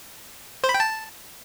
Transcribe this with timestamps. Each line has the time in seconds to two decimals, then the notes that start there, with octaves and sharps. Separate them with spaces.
0.64 C5
0.69 B5
0.74 G5
0.80 A5